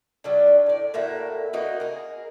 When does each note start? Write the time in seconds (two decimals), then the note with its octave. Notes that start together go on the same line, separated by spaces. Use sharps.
0.24 F#3 G3 D4
0.66 A2 D5
0.94 A2 A#3 F#4 E5
1.53 A#3 B3 D#4 F#4
1.80 G#4 A#4